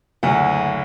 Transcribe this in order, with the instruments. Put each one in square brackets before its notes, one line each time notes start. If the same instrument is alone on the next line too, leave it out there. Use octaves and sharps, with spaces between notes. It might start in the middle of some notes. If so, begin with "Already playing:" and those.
[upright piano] F#1 D2 [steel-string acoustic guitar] F#5